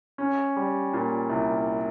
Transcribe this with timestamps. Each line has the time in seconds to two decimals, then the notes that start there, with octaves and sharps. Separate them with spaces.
0.18 C#4
0.56 G3
0.93 A#2
1.29 C2